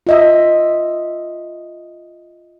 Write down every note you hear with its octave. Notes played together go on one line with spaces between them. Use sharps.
F4 D#5 E5